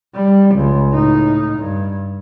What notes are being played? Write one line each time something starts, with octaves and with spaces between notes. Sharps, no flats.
G3
C#2
A2 D#4
G2